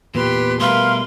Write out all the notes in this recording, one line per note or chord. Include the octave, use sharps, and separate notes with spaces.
E2 A#2 G4 B4 C6
B2 G3 A3 A#4 B4 F5 C6